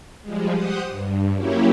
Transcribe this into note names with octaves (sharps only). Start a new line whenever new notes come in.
F3 G3 G#3
G4 C5 F#5 D#6
G2
F#3 A#3 C#4 E4 G4